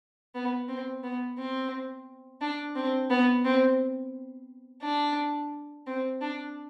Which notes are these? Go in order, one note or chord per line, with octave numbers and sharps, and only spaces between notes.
B3
C4
B3
C4
D4
C4
B3
C4
D4
C4
D4